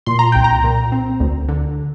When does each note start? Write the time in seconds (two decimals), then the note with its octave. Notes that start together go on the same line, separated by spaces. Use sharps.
0.06 A#2 C6
0.19 A#5
0.32 C2 G5
0.44 A#5
0.64 A#2
0.92 C4
1.20 D2
1.48 D3